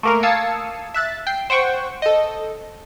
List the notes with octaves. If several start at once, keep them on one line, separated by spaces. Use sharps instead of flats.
A3 A#3 A#4
F5 A5 D#6 E6 G#6 C#7
E5 F#6 A6
G5 C7
C5 F#5 G5 C#6
A4 D#5